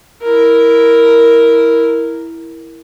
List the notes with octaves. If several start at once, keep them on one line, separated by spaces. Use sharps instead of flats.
E4 A#4